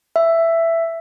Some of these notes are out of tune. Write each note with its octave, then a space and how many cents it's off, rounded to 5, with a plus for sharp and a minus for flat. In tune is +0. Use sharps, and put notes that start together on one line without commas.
E5 +10